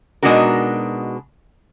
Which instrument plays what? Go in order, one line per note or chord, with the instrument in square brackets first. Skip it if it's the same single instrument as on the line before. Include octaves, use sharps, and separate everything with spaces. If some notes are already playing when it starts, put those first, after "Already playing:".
[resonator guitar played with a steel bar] B2 G#3 D4 D#4 F#4 A#4